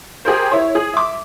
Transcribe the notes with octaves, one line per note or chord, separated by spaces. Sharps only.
G4 G#4 A#4 C5
E4 C#5
G#4
E5 D6